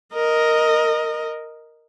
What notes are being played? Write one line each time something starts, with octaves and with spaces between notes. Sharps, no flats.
A#4 D#5